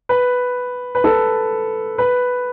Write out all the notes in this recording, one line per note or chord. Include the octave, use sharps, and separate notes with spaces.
B4
B4
A4
B4